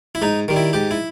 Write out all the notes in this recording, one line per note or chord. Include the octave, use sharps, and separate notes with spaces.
E4
G#2 D#4
D#3 G3
E4
G#2 G4
E4